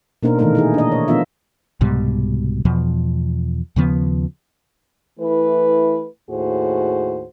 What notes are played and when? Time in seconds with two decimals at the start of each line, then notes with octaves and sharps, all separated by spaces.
0.23 B2 A#3 D4 D#4 A#4 C5
0.39 A#2 D#3 E3 A3 D#4 A#4
0.55 D#4 E4 G#4
0.74 D4 D#5
0.92 C#5
1.08 F3 B3 D4 F4 E5
1.81 C2 G#2 B2 G3
2.65 E2 B2 F3
3.76 D#2 C#3 F3 B3
5.20 E3 A3 E4 B4
6.30 D#2 A2 F#4 G#4 C5